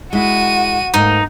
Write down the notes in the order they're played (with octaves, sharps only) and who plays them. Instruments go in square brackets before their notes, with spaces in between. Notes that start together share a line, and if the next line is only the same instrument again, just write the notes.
[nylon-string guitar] G#3 E4 [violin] F#4 D#7
[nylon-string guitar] G#2 A3 A#3 [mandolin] D#4